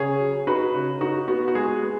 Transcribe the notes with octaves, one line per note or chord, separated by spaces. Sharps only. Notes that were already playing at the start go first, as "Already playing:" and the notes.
Already playing: C#3 G#4 C#5
F#3
D#4 F#4 B4
C#3
D#4 F#4
B3 F#4
F#4
G#3 G#4
B3